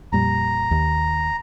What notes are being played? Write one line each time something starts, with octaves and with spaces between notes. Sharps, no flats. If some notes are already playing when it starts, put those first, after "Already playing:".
F2 A#2 G3 A#5
D#2